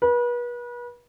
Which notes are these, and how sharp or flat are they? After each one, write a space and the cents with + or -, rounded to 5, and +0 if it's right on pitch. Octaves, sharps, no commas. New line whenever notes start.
B4 -35